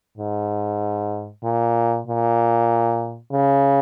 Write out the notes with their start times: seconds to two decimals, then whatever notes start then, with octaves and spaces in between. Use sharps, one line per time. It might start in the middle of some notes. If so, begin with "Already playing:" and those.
0.17 G#2
1.43 A#2
2.07 A#2
3.32 C#3